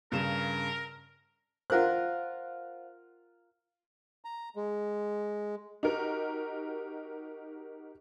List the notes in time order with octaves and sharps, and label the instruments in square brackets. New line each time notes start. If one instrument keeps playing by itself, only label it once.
[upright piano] G2 C#3 E7 [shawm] A#4
[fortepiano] F4 A#4 F#6 [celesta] C5 F5 F#5
[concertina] A#5
G#3
[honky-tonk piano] D#4 F#4 G4 A#4